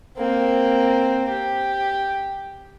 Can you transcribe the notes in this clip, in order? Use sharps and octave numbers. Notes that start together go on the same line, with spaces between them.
A#3 C4
G4